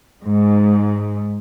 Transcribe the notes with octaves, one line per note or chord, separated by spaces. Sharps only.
G#2